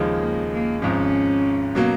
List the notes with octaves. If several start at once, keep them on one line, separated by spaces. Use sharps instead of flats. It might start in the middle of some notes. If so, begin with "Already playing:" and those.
Already playing: D#2 C#3 F3 G#3 D#4
A#3
A#3
G#1 G#2 F3 C#4
B2 F#3 A#3